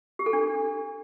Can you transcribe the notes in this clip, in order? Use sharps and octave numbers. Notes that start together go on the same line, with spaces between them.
G4
A4
D4